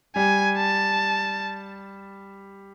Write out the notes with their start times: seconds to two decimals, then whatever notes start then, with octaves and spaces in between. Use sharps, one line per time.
0.16 G3 G#5
0.57 A5